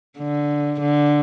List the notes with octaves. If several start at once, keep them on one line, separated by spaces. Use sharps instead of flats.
D3
D3